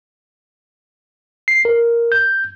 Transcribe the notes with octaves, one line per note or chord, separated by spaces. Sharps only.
C7
A#4
G6